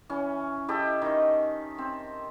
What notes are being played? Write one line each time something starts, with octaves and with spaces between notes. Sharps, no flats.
E3 C#4
E4 G4 A4 D#5
D#3
C4